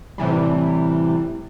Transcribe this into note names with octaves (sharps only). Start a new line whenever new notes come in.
A2 C3 E3 G3